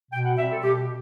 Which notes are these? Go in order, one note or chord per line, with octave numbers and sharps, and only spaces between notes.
B2 G5
F#5
G3 C4 E5
A4
B2 G4